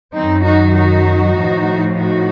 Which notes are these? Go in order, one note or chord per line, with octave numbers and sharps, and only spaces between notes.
F#2 D#3 F#3 C4 D#4
D#4 F#4
D#4 F#4
A2 F3
D#4 F#4